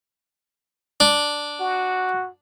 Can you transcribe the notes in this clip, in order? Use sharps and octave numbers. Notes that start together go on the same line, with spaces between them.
D4
F#4